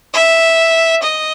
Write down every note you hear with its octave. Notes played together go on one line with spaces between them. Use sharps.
E5
D#5